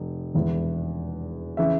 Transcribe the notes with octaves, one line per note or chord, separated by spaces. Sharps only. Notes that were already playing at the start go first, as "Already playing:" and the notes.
Already playing: F1
E1 E2 E3
C#3 E3 E5